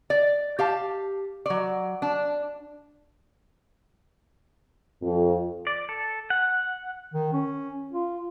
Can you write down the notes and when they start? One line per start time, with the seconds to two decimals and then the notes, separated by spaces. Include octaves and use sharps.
0.10 D5
0.59 G4 F5 A5
1.46 F#3 D5
2.02 D4
5.02 F2
5.67 D5
5.89 A4
6.30 F#5
7.14 D#3
7.33 C#4
7.92 F4